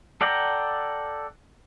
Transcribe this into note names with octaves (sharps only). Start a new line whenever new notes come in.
A4 D5 F#5 G5 A#5